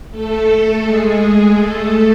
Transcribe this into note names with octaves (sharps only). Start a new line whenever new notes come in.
A3 A4
G#3 G#4
A3 A4